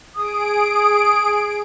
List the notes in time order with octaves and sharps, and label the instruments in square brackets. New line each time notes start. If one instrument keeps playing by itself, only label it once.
[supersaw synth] G#4 D7 [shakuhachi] D#6